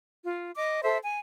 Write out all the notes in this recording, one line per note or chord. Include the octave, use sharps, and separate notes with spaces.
F4
D#5 D6
A4 C5 E5
G#5